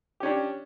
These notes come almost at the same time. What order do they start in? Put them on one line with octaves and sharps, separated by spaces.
G4 C#4 D4